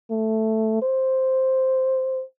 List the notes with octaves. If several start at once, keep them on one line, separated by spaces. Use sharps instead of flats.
A3
C5